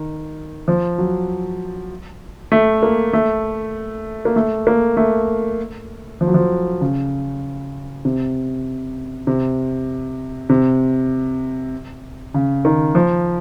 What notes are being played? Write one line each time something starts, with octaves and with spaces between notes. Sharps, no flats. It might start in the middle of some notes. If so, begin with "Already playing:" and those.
Already playing: D#3
F3
F#3
A3
A#3
A3
A#3
A3
A#3
A3
F3
F#3
F3
C#3
C3
C3
C3
C#3
D#3
F3